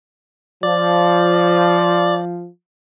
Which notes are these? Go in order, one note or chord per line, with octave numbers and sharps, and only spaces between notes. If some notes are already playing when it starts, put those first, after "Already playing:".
F3 D5